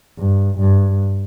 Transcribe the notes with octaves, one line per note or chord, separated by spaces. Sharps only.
G2
G2